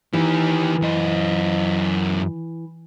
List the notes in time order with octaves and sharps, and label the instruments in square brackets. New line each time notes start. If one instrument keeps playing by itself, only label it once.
[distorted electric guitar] D#3 G4 [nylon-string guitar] E3
[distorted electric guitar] F#2 D#5